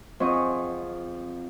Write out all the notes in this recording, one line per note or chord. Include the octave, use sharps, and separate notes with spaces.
F2 C4 G#4 D#5 F#5 C#6